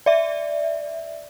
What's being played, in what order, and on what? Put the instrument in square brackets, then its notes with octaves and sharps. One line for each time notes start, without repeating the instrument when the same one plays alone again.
[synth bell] D5 E5